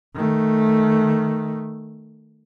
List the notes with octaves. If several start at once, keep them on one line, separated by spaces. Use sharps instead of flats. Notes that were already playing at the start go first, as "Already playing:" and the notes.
D#3 A3